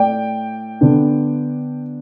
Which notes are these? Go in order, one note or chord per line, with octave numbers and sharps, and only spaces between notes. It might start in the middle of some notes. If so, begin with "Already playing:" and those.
Already playing: A2 A3 D5 G5
D3 B3 D4